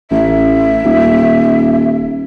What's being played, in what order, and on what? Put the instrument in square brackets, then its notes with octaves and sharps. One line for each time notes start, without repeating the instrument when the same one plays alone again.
[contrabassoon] A1 [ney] E5
[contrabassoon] D#1